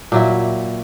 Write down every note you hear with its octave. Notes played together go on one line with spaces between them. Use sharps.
A#2 F#3 E4